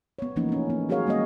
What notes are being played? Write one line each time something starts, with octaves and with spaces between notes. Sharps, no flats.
B3 C#5
E3 F3 A3 A#3 C#4 D#4
A3 C#4
B3 D#4
F#3 F#4 G#4 A#4 C#5 F5
G3 G#3 A#3 B3 C#4 D#5